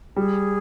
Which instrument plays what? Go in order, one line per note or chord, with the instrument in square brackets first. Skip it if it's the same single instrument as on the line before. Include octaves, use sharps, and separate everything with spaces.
[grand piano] G3 [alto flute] G#4